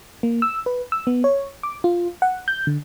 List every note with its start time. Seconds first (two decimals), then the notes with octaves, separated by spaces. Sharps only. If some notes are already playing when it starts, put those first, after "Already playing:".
0.23 A#3
0.42 E6
0.66 B4
0.92 E6
1.07 B3
1.24 C#5
1.63 D6
1.84 F4
2.22 F#5
2.48 G6
2.67 D3